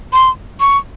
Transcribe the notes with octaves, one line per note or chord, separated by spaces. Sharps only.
C6
C#6